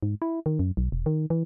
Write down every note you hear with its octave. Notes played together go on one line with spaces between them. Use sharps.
G#2
E4
D#3
F#2
B1
E1
D#3
E3